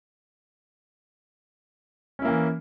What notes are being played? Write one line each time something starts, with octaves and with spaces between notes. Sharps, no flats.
E3 A#3 C#4 E4